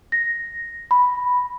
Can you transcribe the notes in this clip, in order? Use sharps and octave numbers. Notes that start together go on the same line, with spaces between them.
A#6
B5